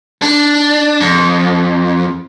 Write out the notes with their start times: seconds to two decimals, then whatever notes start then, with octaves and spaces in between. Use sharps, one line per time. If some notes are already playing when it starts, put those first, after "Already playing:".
0.22 D4
1.01 F2